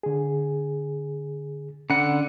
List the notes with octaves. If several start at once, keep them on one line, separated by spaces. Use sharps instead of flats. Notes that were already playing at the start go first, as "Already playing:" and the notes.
D3 G#4
D3 C#4 F#5